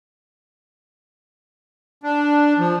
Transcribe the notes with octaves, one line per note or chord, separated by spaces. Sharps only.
D4
F3